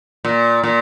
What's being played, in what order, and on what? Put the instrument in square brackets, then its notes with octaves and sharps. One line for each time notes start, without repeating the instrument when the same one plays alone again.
[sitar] A#2
A#2